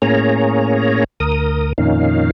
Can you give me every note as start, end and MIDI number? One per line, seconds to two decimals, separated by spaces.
0.02 1.04 45
0.02 1.04 58
0.02 1.04 61
0.02 1.04 68
0.02 1.04 73
0.02 1.04 82
1.20 1.73 38
1.20 1.73 70
1.20 1.73 87
1.78 2.31 41
1.78 2.31 46
1.78 2.31 51
1.78 2.31 61
1.78 2.31 63
1.78 2.31 77